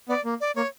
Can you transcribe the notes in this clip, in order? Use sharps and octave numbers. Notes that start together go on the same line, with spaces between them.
B3 D5
A#3
D5
A#3 C#5